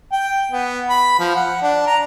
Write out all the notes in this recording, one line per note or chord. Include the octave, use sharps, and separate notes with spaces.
G5
B3
B5
F3
F#5
D4
A#5